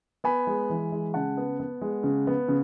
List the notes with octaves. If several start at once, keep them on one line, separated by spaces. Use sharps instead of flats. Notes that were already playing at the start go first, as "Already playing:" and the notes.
B3 G#5 B5
G#3
E3
G#3
C#3 F#5 A5
B3
B3
G#3
C#3
B3
C#3